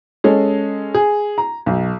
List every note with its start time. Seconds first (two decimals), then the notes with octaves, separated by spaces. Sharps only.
0.24 G#3 C#4 A4
0.94 G#4
1.38 A#5
1.66 B1